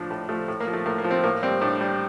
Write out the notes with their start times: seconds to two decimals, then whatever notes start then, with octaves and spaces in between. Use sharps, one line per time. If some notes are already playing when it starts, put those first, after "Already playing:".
Already playing: A2 F3 D4
0.11 A2
0.29 F3 A3
0.48 A2
0.61 A#3
0.67 F3
0.73 A3
0.86 A2 A#3
0.98 A#3
1.04 F3
1.11 C4
1.24 A2 A#3
1.43 G3 C4
1.61 A2 D4
1.81 G3